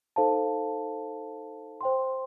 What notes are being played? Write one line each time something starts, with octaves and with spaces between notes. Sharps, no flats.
D#4 A4 C5 F5 A5
C5 G5 C6